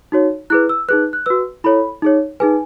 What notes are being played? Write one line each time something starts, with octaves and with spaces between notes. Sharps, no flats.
D#4 F#4 C#5
E4 G#4 B4 F#6
E6
D#4 G#4 B4 F#6
F#6
F#4 B4 E6
E4 A4 C#5 B5
D#4 G#4 C#5
D#4 G#4 B4 G#5